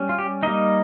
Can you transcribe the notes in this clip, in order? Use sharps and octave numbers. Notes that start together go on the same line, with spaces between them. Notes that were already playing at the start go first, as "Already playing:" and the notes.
Already playing: G3 C#4
F4
G4
G3 A#3 D#4 D#5